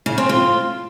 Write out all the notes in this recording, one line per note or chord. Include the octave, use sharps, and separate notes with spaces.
C#3
C4
F4